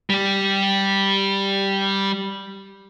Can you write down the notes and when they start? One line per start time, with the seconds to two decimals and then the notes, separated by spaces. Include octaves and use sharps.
0.10 G3 G4